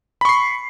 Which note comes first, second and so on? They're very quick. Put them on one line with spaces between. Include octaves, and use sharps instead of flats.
B5 C#6 C7